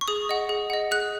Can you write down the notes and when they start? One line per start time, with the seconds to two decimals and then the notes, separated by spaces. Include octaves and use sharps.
0.01 C#6
0.08 G#4 D#6
0.29 D#5 F#5
0.49 G#4
0.70 D#5 F#5
0.91 G#4 F#6